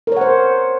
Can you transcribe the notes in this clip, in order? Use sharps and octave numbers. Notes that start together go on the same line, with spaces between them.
A#4 C5 C#5 F#5